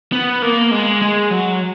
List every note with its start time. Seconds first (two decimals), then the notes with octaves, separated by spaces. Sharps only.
0.13 B3
0.42 A#3
0.71 G#3
1.02 G#3
1.31 F#3